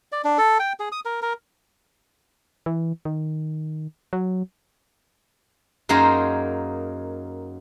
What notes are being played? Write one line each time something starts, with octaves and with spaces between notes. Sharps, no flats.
D5
D4
A4
G5
G#4
D#6
A#4
A#4
E3
D#3
F#3
F#2 A#3 D#4 G#4 C5 A#5